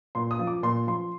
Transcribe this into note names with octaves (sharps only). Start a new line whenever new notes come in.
A#2 C6
D#6
F3
D6
A#2 C6
F3 C6